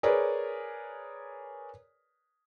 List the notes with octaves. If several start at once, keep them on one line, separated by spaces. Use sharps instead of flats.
G#4 A#4 B4 C#5 D5